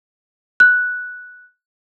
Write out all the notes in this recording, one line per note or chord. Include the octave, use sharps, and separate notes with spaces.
F#6